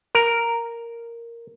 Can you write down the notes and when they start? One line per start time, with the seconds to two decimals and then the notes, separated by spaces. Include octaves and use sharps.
0.15 A#4